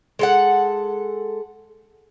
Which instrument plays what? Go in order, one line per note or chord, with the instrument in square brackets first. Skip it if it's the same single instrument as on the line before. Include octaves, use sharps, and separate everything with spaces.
[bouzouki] G#3 A4 F#5